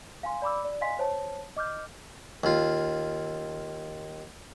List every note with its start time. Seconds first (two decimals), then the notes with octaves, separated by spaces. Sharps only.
0.23 F5 G#5 C6
0.42 D5 B5 D6 E6
0.65 D5
0.81 D#5 F5 G#5 C6 B6
0.99 C5 C#5 A5
1.56 D#5 D6 F6 G6
2.44 D#2 F4